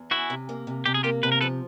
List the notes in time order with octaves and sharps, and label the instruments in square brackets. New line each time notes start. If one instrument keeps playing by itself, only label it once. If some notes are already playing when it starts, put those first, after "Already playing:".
Already playing: [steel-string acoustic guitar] E2
[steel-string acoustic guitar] C#4 [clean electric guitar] E4 F#4
[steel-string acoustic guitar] C3
A#3
C3
[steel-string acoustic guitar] C3 [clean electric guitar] G4
[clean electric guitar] G#4
[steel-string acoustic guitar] A#3 [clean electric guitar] F4 G4
[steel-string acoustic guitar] C3 [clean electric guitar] B4
[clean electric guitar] A#4
[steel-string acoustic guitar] F3 [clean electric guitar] A4 B4